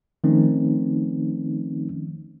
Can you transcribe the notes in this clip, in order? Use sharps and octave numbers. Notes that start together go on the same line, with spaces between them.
D#3 F3 A3 C4 C#4 D#4